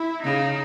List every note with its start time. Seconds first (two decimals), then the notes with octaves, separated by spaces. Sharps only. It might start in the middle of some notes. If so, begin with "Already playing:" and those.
Already playing: E4
0.24 C#3 D#4